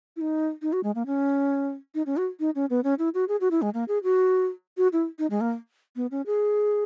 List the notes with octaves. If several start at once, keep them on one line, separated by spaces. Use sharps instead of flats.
E4
D#4
D#4
F#4
G#3
A#3
C#4
D#4
C#4
F#4
D#4
C#4
B3
C#4
E4
F#4
G#4
F#4
E4
G#3
A#3
G#4
F#4
F#4
E4
D#4
G#3
A#3
B3
C#4
G#4